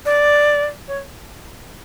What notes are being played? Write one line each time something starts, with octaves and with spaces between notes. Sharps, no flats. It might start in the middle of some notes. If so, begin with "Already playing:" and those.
D5
C#5